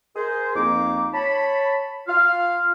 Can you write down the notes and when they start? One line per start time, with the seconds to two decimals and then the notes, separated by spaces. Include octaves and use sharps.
0.16 G#4 A#4 C5
0.56 F2 A#3 D#4 D6
1.14 C#5 A5 B5
2.08 F4 F5